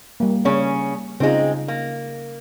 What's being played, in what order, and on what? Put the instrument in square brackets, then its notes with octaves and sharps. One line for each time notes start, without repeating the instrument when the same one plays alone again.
[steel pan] G3 A#3
[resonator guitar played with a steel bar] C#3 C#4
[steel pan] C#3 D#4 F4 [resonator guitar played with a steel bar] G#3 C4
[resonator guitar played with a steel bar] A#3